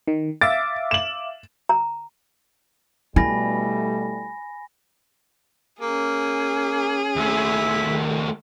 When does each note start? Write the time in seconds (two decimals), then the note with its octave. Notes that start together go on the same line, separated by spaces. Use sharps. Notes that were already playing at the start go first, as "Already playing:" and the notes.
0.08 D#3
0.41 E5 F5 D6 A6
0.91 E7 F#7
1.69 A#5
3.16 B2 G3 A3 E4 G#5 B5 A#6
5.81 A#3 C#4 G#4
7.16 D#2 A3 E4
7.79 D#3